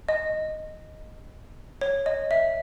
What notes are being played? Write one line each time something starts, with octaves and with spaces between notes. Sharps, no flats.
D#5
C#5
D#5
E5